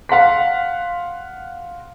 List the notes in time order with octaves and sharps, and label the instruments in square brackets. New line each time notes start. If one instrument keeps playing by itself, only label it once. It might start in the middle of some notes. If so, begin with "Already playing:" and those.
[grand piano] F5 F#5 C6 B6